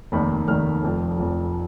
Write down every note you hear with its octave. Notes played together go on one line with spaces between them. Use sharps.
F1 D#2 D#3 B5
F1 D#2 D#3 F6
F1 F2 F3
F1 F2 F3